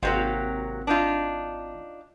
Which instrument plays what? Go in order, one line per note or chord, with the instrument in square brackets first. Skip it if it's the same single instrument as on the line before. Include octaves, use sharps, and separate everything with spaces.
[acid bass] G#1 [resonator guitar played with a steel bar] C3 F#3 A#3
[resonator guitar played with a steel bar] D4 D#4 F4